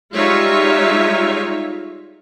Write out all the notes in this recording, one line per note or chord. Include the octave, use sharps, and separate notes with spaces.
G3 G#3 D#4 F4 C#5 E5